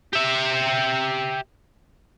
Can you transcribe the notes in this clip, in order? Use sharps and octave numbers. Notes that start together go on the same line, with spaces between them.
G4 E5